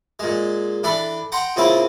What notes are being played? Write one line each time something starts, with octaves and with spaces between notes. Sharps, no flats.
A#2 G#3
E3 D4 A4 B5
F#5 G5 A#5 C6
A#2 C#3 C4 E4 A5